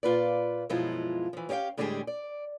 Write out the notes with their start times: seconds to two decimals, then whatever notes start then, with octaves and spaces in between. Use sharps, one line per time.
0.03 A#2 F4 B4 D5
0.70 F#2 B2 F3 G#3 E4 F4
1.33 E3 F3
1.49 C#4 G4 D5 F5 G5
1.77 A2 D3 G3 G#3 G4 G#4
2.07 D5